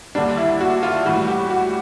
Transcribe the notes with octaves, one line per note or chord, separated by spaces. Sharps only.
D#2 D3 G3 D4
E4
F#4
F4
A2 E3 G3 F#4
G4
F#4